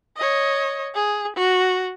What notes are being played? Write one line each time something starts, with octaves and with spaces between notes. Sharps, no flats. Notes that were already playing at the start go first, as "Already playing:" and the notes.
C#5 D#5
G#4
F#4